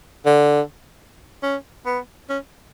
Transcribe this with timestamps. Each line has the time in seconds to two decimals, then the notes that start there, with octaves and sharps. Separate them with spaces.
0.26 D3
1.43 C#4
1.86 B3
2.29 C#4